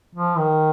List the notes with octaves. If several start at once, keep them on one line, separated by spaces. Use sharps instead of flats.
F3
D#3